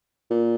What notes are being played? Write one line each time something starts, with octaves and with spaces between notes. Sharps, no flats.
A#2